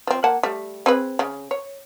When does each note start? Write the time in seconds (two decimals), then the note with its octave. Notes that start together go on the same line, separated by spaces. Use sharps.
0.07 F3 C4
0.24 A#3 F#5 A5
0.43 G3 A3
0.86 C4 G#4 B4
1.19 C#3
1.51 C#5